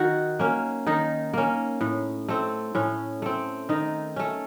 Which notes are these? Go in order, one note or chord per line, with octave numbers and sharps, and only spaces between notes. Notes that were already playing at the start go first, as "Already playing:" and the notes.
Already playing: D#3 F#4
A#3 C#4
D#3 D#4
A#3 C#4
A2
A3 C4
A2 C#4
A3 C4
D#3 D#4
A3 C#4